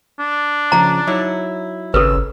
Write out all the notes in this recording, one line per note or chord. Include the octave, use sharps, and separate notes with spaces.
D4
C#3 F3 A#5
F#3 D#4 E4
G#1 C#3 A4 B4 E6